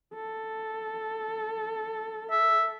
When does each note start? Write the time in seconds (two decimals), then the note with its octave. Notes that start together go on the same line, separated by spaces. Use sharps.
0.14 A4
2.31 E5